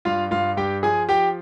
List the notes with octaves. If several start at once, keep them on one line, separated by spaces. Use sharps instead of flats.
G2 F4 F5
G2 F4 F5
G2 G4 G5
F3 G#4 G#5
F3 G4 G5